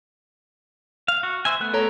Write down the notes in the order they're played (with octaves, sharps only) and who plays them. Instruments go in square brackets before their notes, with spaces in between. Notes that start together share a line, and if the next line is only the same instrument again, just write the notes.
[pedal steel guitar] F5
F#4
C5 E5 G#5
A3 B3 F#6
[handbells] A4 C#5 A#5